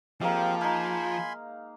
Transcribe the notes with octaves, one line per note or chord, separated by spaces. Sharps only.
F3 G#3 A#3 C4 G4 F5
D#4 F5 G#5 B5 C6